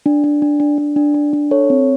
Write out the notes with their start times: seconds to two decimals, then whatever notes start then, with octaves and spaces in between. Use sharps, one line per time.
0.06 D4
0.24 D4
0.42 D4
0.60 D4
0.78 D4
0.96 D4
1.14 D4
1.33 D4
1.51 A4 C#5
1.70 C4